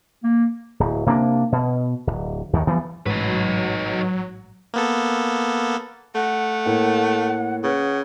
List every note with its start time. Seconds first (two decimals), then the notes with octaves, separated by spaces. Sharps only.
0.23 A#3
0.80 D1
1.06 C3 A#3 B3 D4
1.52 B2
2.07 D1 C#2
2.53 D#2 D#3
2.67 E3 F3 G3 B3
3.06 A1 G#2 F#3 D#4 B4
4.74 A#3 B3 A4
6.15 A3 F#5
6.65 A2 A#3
7.64 C#3 B4 F#5